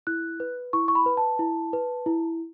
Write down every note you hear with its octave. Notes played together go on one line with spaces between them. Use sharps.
E4 F#6
B4
E4 C#6
C#6
B5
B4
A5
E4
B4
E4